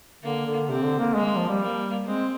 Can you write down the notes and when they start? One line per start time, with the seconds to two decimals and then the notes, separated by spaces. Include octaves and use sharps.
0.23 D3 A#3
0.46 D3
0.69 C3 C4
0.84 D3
0.99 A#3
1.14 G#3 A#3
1.26 G#3
1.37 F3
1.49 G3
1.60 A#3
2.06 G#3 C4